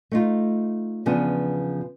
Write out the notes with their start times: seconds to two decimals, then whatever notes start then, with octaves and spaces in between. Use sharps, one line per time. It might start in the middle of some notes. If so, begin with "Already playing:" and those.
0.11 A3 D#4 F4
1.06 E2 C#3 F3 B3 D4